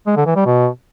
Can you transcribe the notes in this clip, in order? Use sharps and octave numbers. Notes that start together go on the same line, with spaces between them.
G#3
D3
E3
G3
B2